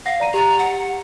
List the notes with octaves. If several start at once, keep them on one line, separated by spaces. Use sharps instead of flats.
F5 F#5 A#6 C7
D5 A#5 D#7
G4 A#5 A6
F#5